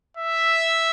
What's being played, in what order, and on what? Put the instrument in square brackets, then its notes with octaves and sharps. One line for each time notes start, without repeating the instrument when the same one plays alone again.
[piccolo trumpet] E5